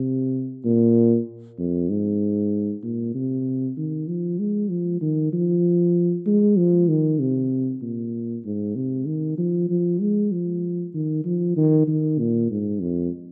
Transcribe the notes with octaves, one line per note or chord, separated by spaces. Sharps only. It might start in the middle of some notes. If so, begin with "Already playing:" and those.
Already playing: C3
A#2
F2
G#2
A#2
C3
D#3
F3
G#3
F3
D#3
F3
G#3
F3
D#3
C3
A#2
G#2
C3
D#3
F3
F3
G#3
F3
D#3
F3
D#3
D#3
A#2
G#2
F2